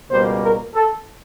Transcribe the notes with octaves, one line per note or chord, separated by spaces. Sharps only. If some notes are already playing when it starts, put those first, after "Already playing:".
C#2 B2 G3 A#3 C5
A#4
A4